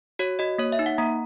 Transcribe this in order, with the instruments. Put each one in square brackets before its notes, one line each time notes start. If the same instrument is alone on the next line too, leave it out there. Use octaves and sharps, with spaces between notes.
[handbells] F#4 C#5
F#4 D#5
A#3 C#5
E5
D#4
F#5
A#3 A#5